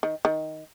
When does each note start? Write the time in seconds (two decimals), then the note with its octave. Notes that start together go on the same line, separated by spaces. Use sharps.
0.03 D#3
0.25 D#3